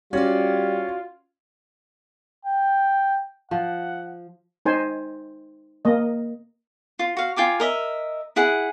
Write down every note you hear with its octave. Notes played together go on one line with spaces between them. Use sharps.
G3 C#4 F4 F#4 D5
G5
F3 F#5
D#4 C5 G#5
A#3 D#5
F4
F#4 F5
F4 G5 G#5 D6
A#4 D#5 E5
E4 G#4 F#5